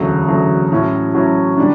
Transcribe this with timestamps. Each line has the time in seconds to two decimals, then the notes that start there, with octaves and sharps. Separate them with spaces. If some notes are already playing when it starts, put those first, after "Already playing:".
Already playing: E1 D2 C#3 F#3
0.28 E1 D2 C#3 F#3
0.72 A2 F#3 C#4 E4
1.14 A2 F#3 C#4 E4
1.57 D3 G3 D4